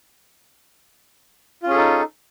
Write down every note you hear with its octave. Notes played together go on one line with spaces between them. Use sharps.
C#4 D#4 F4 G#4 A4